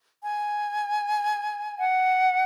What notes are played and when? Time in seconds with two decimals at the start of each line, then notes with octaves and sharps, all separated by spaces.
0.23 G#5
1.78 F#5